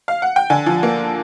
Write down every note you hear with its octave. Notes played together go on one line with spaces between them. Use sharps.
F5
F#5
G5
D3 G#5
F3
A#3